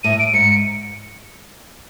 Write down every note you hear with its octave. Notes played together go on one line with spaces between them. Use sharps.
A2 D#7
D7
G#2 C#7